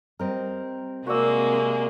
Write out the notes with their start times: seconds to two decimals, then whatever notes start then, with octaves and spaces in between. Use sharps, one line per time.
0.19 G3 C4 A#4 D#5
1.07 C3 G#3 A#3 F#4 D5 E6